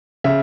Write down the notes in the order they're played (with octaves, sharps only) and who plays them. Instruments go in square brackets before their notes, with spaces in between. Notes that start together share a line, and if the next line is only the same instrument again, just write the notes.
[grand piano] C#3 E5